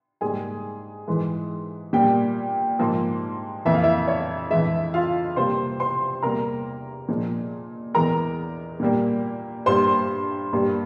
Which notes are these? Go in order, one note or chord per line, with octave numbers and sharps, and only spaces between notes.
G#2 G3 A#3 G#4 G#5
G#2 E3 G#3
A#2 G3 A#3 G4 G5
G#2 F3 A#3
F2 E3 A#3 E5
F5
E4 E5
C#5
F2 E3 G#3 E4 E5
F4 F5
C3 G3 A#3 C5 C6
C5 C6
E2 C3 G3 A#3 A#4 A#5
A#2 F3 G#3
E2 E3 G#3 A#4 A#5
A#2 G3 A#3
G2 G3 A#3 C5 C6
G2 G3 A#3